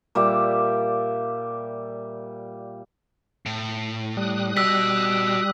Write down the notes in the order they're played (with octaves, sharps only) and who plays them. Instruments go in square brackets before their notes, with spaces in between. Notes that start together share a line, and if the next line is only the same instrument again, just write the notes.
[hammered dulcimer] A#2 G3 D5 E5
[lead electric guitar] A2
[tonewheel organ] G3 D#6 F#6
[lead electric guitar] F#4 D#5 [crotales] E6 B6